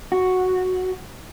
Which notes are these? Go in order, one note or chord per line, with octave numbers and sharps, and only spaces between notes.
F#4